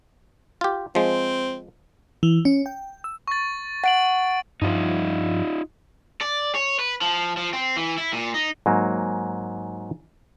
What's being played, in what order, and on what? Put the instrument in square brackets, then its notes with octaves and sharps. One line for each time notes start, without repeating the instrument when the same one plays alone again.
[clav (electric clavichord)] F4 G4
[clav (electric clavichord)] F3 G#3 [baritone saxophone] C4
[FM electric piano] E3
C#4
G5
E6
[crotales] C#6 A6
[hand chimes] F#5 [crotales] A6 D7 F#7
[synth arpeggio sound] G2 F3 [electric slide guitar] D#4 F4
[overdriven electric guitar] D5
C#5
B4
F3
F3
C4
E3
E4
A#2
D#4
[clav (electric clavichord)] G#2 F#3 A#3